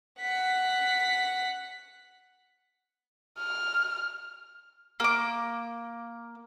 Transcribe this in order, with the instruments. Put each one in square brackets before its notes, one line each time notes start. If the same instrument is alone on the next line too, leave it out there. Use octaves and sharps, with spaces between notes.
[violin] F#5 B6
[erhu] F6
[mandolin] A#3 D6